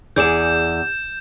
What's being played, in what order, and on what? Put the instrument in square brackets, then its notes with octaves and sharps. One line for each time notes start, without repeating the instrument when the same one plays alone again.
[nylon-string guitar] E2 G#4 D5 [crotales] G6 E7